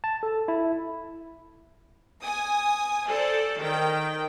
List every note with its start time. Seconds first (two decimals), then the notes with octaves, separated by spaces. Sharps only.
0.04 A5
0.23 A4
0.48 E4
2.22 G#5 D#6
3.07 A4 C5 D5
3.59 D#3 G5